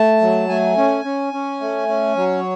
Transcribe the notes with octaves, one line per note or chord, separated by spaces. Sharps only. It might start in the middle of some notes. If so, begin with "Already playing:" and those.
Already playing: A3 A5
F#3
A3 G#5
C#4
C#4
C#4
A3
C#4
F#3 C#5